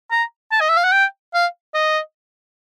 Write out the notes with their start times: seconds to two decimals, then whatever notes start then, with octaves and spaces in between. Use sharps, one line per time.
0.11 A#5
0.51 A5
0.61 D#5
0.69 E5
0.77 F5
0.84 F#5
0.92 G5
1.34 F5
1.74 D#5